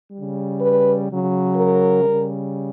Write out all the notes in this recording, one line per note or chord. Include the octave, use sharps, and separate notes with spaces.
C#3 G3
B4
C#3 F#3
A#4
C#3 G3